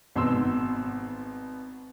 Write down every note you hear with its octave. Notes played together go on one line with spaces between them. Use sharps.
G#1 B2 C6 E6